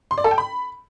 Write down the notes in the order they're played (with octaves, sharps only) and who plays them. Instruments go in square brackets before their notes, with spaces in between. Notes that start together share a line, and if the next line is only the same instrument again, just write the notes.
[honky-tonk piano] C6
D5
A4
G5
B5